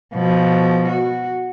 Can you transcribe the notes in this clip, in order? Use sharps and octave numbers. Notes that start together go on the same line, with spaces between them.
B2 F3
F#4